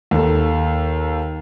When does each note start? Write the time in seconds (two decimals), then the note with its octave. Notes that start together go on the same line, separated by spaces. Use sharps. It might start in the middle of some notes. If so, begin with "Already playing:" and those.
0.11 D#2 A4